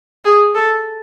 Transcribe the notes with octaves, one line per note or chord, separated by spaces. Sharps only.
G#4
A4